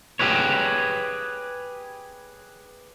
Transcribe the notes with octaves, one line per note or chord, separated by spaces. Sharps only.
G4 G#4 B4 C#5